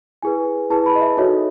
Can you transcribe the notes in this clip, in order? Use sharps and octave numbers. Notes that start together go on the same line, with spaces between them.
E4 G#4 B4 G#5
E4 G#4 B4 A5
B5
D#5
E5
D#4 F#4 A4 C#5 D#5